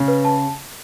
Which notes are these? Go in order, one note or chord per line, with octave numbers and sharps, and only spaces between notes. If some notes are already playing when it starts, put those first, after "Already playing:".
Already playing: C#3
B4
A5